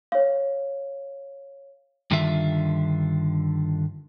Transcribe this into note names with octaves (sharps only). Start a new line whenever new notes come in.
C#5 F5
G2 D3 D#3 F4 E5